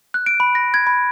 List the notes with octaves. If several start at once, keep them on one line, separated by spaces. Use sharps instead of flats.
F#6
D7
B5
A#6
G#6
B5